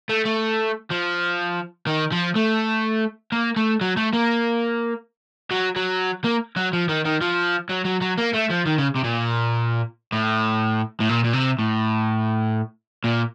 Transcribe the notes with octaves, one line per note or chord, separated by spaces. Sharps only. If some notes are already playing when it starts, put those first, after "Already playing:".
A3
A3
F3
D#3
F3
A3
A#3
A3
F#3
A3
A#3
F#3
F#3
A#3
F#3
F3
D#3
D#3
F3
F#3
F#3
F#3
A#3
A3
F3
D#3
C#3
C3
A#2
A2
A2
A#2
A#2
C3
A2
A#2